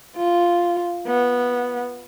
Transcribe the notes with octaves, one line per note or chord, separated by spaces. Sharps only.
F4
B3